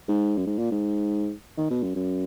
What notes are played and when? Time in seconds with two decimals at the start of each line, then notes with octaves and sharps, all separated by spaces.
0.08 G#2
0.37 F#2
0.46 G#2
0.58 A#2
0.71 G#2
1.58 D#3
1.70 B2
1.83 F#2
1.95 F#2